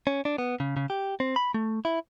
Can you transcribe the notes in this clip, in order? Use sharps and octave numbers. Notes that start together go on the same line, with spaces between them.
C#4
D4
B3
C#3
C#3
G4
C4
B5
A3
E4